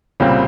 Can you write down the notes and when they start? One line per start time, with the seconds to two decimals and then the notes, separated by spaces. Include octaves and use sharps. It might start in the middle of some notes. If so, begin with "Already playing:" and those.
0.20 C2 A#2 C#3 G3 C4